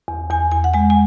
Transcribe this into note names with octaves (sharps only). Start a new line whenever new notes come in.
E2
E2 G#5
E2 G#5
F#5
G#3 G#5
G#5